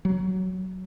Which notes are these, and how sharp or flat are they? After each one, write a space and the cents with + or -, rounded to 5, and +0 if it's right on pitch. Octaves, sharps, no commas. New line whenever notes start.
F#3 +10